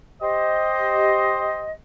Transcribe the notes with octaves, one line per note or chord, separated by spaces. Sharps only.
G4 C5 D#5